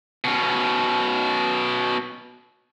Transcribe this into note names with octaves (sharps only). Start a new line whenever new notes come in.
B2 C#4